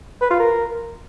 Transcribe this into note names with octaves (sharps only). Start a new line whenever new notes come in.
B4
F4
A#4